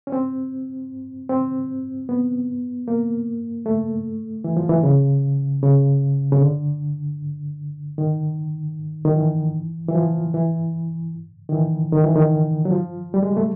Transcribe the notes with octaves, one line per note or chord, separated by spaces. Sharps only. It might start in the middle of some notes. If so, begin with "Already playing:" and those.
C#4
C4
C4
B3
A#3
A3
E3
F3
E3
C#3
C#3
C#3
D3
D#3
D#3
E3
E3
F3
E3
D#3
E3
D#3
E3
D#3
F#3
F3
G3
G#3
A3